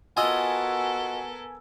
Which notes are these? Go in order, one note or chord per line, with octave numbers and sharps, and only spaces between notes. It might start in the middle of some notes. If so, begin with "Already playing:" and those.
B3 F4 F#4 A4 A#4 D#5 G#5 E6